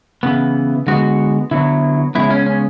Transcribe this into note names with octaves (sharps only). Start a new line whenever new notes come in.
C#3 E3 B3
D3 G#3 B3 F#4
D3 F#3 B3 E4
C#3 G#3 B3 E4
C#4
C#4